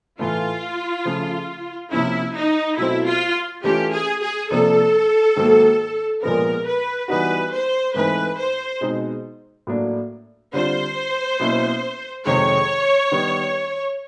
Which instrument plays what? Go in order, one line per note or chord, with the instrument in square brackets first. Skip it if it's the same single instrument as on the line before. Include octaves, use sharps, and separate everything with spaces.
[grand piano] A2 E3 A3 [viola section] F4
[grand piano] C#3 F3 A3
[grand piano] C3 F3 A#3 C#4 [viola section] E4
[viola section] D#4
[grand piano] B2 F#3 A3 C4 [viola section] E4
[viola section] F4
[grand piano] E3 A3 C#4 F4 [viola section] G4
[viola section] G#4
G#4
[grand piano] C3 F3 A#3 D4 [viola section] A4
[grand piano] G#2 D#3 F#3 A#3
[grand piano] A#2 F3 G#3 B3 [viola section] A#4
[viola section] B4
[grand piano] E3 G3 B3 D#4 F#4 [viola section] B4
[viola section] C5
[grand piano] G#2 E3 A3 C4 D#4 [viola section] B4
[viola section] C5
[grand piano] B2 G#3 C4 D#4
A2 F#3 A#3 D4
[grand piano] D3 G3 C4 F4 [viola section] C5
[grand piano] B2 F#3 A#3 C#4 E4
[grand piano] F2 C3 D#3 G#3 [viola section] C#5
[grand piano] D#3 G3 B3